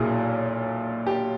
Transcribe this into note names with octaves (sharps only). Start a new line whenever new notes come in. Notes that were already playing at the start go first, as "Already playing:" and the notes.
Already playing: B1 A#2 F#3 E4 G#4
G4